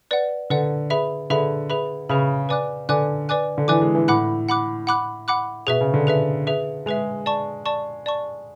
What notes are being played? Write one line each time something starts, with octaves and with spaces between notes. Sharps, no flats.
B4 D5 F#5
D3 B4 D5 F#5
G#4 B4 E5 B5
D3 G#4 B4 E5 B5
G#4 B4 E5 B5
C#3 G#4 B4 E5 B5
B4 D5 G#5 D6 F#6
D3 B4 D5 G#5 D6 F#6
B4 D5 G#5 D6 F#6
D3
E3 B4 D5 G#5 D6 F#6
G#3
E3
A2 F#5 B5 D6 F#6
F#5 B5 D6 F#6
F#5 B5 D6 F#6
F#5 B5 D6 F#6
B2 G#4 B4 E5
C#3
D3
G#4 B4 E5
G#4 B4 E5
G#3 G#4 B4 E5
D5 A5 C#6
D5 A5 C#6
D5 A5 C#6